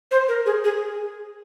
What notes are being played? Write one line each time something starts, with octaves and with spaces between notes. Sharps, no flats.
C5
A#4
G#4
G#4